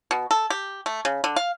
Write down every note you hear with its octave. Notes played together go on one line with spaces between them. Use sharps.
B2
A4
G4
A3
C#3
D3
F5